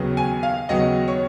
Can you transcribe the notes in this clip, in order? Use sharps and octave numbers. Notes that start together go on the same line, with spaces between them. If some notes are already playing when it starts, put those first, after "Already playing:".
Already playing: D#2 C#3 F#3 B3
G#5
F5
D#2 C#3 F#3 B3 D#5
C#5